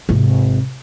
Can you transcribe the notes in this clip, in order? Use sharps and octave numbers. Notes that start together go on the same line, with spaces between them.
G#1 C3